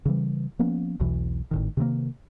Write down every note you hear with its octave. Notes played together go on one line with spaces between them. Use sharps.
C#3 E3 G3
F3 A#3 B3 C#4
B1 E2 B2 E3
G#1 A2 D#3
C3 D#3 F3 A#3